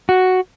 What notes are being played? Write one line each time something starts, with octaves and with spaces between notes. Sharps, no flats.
F#4